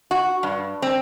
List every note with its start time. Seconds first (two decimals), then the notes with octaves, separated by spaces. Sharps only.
0.11 F#4
0.43 G2
0.82 C4